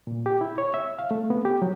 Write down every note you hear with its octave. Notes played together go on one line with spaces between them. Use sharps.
A#2
G4
E4
C#5
E5
F5
A3
B3
G4
F#3